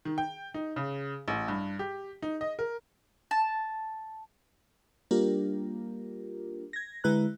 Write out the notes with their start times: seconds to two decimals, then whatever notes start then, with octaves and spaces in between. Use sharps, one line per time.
0.05 D#3
0.18 G5
0.54 D#4
0.76 C#3
1.28 A1
1.48 G2
1.79 G4
2.22 D#4
2.41 D#5
2.59 A#4
3.31 A5
5.11 G3 A#3 D4 F4 G4 A#4
6.73 G#6 A#6
7.04 D3 G#3 E4 B4 A#5 F#6